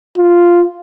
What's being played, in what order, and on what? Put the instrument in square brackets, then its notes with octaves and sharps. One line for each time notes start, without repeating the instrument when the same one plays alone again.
[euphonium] F4